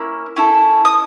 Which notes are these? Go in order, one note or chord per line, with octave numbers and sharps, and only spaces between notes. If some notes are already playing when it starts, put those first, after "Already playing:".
Already playing: A#3 C#4 E4
C#4 E4 A4
D#6